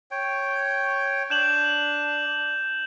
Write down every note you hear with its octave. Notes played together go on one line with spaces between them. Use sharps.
C#5 G5
D4 G6 E7 F#7